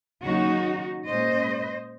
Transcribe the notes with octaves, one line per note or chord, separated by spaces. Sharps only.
D#2 C#3 F#3 C#4 D#4 F#4
A#2 G#3 C#4 C5 D#5